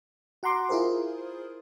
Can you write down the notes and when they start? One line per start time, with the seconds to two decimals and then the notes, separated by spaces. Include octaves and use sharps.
0.43 F#4 F#5 A#5 C6 D6
0.69 E4 F4 G#4 A#4 C5